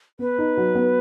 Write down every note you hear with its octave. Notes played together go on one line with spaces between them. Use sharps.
B3 B4
D#4
F#3
B3